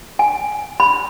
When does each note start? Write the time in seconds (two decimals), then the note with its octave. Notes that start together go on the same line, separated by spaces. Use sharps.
0.19 G#5
0.80 B5